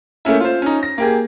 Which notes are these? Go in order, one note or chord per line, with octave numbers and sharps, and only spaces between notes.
A3 A#3 C#4 E4
F4 C5
C#4 D#4
A#6
A#3 G4 G#4